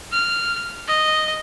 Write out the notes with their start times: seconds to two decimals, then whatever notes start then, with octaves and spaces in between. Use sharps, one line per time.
0.13 F6
0.88 D#5